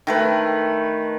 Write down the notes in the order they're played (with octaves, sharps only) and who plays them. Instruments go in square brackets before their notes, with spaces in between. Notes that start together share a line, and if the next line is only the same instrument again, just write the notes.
[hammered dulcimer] D#3 A3 B4